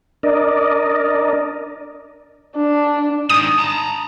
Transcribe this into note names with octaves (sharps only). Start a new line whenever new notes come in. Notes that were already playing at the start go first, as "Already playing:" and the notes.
D4 A#4 D5 D#5
D4
G#2 D#3 D#6
A5 A#5